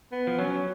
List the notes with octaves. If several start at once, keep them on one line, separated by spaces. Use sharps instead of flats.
B3
F3
F#3 C#4